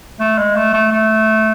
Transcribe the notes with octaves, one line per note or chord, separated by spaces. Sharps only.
A3
G#3
A3
A3
A3